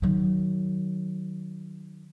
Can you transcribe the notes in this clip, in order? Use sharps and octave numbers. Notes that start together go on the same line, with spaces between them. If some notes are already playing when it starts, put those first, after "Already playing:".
D#3 F#3